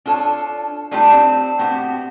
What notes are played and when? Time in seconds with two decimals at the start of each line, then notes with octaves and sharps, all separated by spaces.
0.06 D4 F4 A4 C#5
0.91 G3 A3 D4 D#4 F4 G4
1.12 C4
1.59 A2 B3 C4 F#4 G4